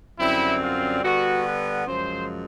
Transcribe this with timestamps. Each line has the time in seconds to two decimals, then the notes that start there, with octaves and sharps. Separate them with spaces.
0.20 F#2 D3 G3 C4 E4
0.62 F4
1.04 D3 G3 B3 F#4
1.45 B4
1.87 F#2 C#3 F3 G#3 C5